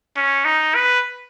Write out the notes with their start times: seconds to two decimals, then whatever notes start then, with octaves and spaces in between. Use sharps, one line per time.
0.16 C#4
0.45 D#4
0.75 B4